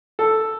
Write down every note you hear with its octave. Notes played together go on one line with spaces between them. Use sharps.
A4